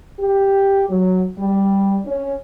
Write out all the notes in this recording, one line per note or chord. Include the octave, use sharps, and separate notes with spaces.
G4
F#3
G3
C#4